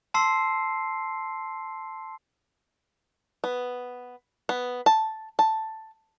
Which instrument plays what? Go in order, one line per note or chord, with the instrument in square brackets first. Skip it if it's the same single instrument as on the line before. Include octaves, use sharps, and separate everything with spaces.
[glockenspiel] A5 C6 E6 C7
[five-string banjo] B3
B3
A5
A5